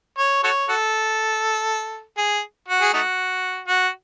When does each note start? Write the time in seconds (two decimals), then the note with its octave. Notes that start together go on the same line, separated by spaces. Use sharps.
0.18 C#5
0.43 F#4 A4 C#5
0.69 F#4 A4
2.17 G#4
2.68 F#4
2.82 G#4
2.93 A3 D#4 F#4
3.68 F#4